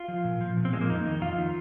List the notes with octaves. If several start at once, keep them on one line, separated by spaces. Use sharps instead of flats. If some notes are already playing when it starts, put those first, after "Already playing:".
Already playing: F4
F3
A#2
F3
A#2
C4
F3 G#3
A#3
F2 D#4
D#3
F2 F4
D#3